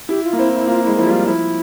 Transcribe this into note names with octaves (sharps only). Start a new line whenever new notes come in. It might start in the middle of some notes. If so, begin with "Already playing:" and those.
E4 G4
F4
A#3
C4 E4
E4
A#3 F4
G#3 E4
F3 E4
G3 F4
F3 E4